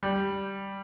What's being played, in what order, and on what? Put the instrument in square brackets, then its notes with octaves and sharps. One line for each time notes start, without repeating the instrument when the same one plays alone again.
[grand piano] G3